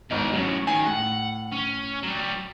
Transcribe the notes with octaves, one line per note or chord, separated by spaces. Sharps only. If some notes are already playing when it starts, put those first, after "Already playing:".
G#1 E2 D#4 A#4
F#2 A2 F#3 C#4
D#3 G#5
A2 F#5
C#4
F#3 G3